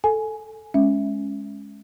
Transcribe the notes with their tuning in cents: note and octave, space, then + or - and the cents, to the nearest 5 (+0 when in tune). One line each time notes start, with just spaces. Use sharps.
A4 +0 G#5 +10
G#3 +10 C#4 +0 E5 +0